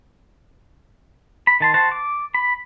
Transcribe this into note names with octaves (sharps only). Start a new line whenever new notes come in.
B5
D#3 A5 C6
F#4 C5 A5
D6
B5